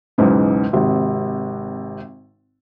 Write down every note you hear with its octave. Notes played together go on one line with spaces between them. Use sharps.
B1 E2 G#2 C#3
G#1 C3